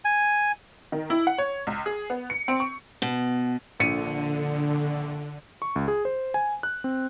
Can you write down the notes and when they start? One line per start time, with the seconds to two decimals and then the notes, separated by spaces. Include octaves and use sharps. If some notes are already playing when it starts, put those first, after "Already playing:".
0.05 G#5
0.92 D#3
1.10 E4
1.27 F#5
1.38 C#5
1.67 C#2
1.86 G#4
2.10 B3
2.30 C#7
2.48 C4
2.60 C#6
3.02 B2
3.80 A#1 D3 C#7 D#7
5.62 C#6
5.76 C#2
5.88 G#4
6.05 C5
6.34 G#5
6.63 F#6
6.84 C4